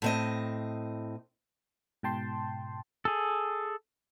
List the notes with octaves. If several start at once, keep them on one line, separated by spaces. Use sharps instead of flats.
A2 C4 D#5
G#2 B2 G5 A5 C6
G#4 A4